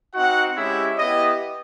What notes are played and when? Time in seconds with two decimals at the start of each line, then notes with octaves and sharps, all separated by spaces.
0.14 C4 D#4 F#4 F#5
0.57 G#3 C#4 E4 G4 E5
0.97 B3 E4 G4 D#5